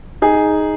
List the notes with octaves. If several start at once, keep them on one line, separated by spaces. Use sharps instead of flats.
D#4 G#4